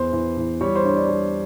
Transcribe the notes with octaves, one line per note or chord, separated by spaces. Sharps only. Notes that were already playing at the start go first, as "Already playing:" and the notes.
Already playing: E2 C5
E3
E3
G3 C#5
C5
D4 C#5
D5
G3